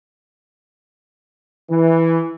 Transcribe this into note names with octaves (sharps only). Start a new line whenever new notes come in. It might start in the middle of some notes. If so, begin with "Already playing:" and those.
E3